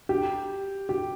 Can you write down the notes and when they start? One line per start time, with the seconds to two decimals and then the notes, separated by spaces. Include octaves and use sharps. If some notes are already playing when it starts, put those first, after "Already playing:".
0.09 G4
0.89 G4